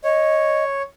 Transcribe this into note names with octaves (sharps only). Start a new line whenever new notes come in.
C#5 D#5